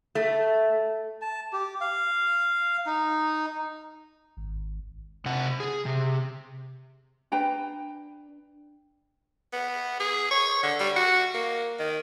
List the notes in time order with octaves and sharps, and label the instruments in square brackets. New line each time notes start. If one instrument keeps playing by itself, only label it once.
[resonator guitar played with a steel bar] A3
[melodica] A5
G4
F5
D#4
[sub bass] G#1
[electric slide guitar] C3 F#5
G#4
C3
[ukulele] D4 B4 G5 A#5
[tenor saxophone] B3
G#4
C#5
D3
G3
F#4
A#3
D#3